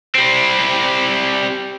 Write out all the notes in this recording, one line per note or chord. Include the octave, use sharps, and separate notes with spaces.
G3 C4